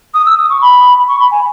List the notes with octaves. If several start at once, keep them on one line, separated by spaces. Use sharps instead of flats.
D#6
E6
D#6
C#6
B5
C#6
B5
G#5